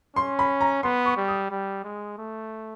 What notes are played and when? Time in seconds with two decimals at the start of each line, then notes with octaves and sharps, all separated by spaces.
0.16 C#4 C6
0.39 B5
0.61 A#5
0.83 B3 C6
1.06 C#6
1.17 G3
1.28 D#6
1.50 G3
1.84 G#3
2.18 A3